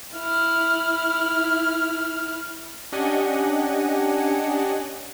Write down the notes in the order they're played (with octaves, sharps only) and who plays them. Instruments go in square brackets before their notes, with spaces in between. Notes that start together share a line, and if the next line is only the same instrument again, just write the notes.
[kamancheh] E4 F6
[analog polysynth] C#4 D4 G4 D#5 F#5 G#5